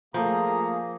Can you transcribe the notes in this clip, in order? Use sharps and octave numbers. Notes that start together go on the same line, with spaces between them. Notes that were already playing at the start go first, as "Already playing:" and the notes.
F3 A3 A#3 G#4 F5 A#5